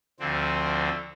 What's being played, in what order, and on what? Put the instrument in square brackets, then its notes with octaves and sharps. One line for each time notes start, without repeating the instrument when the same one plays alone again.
[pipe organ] D2 D3 F3 C4